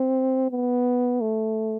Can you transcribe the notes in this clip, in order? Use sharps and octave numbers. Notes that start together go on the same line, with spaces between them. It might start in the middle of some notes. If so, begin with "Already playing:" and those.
Already playing: C4
B3
A3